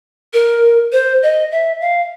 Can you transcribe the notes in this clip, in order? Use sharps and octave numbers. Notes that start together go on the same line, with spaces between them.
A#4
C5
D#5
E5
F5